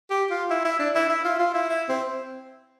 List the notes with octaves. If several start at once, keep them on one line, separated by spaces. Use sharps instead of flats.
G4
F4
E4
E4
D4
E4
E4
F4
F4
E4
E4
C4